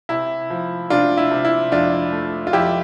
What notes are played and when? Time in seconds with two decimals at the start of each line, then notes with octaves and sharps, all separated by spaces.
0.09 C3 E4
0.50 F3
0.90 C3 D4 F4
1.17 E4
1.31 C3
1.45 E4
1.72 F2 D4 F4
2.12 A3
2.47 F4
2.53 F2 E4 G4